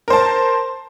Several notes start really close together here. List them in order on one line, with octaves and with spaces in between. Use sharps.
A#4 C5 A5